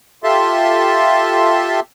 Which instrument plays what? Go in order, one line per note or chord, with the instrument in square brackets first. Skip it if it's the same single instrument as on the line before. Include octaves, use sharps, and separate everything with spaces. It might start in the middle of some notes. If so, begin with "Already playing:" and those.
[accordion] F4 G4 A4 E5 A5 C6